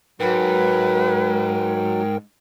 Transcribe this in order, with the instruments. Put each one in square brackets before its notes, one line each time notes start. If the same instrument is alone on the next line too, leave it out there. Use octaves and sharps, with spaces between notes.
[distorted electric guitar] G#2 [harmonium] F#3 [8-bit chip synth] A#4 G5 [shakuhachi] B4